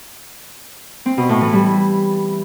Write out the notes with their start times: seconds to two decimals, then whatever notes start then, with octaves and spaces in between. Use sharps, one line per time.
1.06 C4
1.17 B2
1.29 A2
1.41 E3
1.53 G3